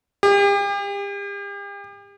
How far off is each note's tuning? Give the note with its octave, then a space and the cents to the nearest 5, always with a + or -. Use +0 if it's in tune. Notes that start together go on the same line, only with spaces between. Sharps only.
G4 +40